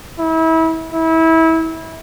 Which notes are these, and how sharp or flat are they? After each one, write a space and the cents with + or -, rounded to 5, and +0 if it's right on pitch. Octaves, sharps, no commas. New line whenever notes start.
E4 -30
E4 -25